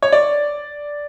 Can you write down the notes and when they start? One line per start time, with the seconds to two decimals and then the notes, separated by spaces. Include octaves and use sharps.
0.02 C#5
0.13 D5